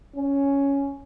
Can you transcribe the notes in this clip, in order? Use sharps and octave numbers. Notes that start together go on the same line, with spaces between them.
C#4